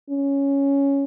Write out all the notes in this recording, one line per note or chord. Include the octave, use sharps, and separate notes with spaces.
C#4